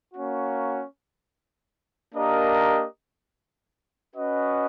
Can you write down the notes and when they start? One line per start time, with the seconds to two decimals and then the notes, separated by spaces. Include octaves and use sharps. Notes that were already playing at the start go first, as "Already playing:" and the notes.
0.13 A#3 C#4 F#4
2.15 A#3 D4 G4 A#4 D#5
4.15 C#4 F#4 B4 D#5